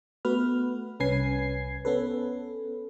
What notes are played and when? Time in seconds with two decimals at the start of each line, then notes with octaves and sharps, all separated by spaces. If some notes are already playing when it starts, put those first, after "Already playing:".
0.25 A3 B3 F#4 B4 F6
1.00 C2 C#4 B4 G#5 G#6 C7
1.85 B3 C#4 A4 B4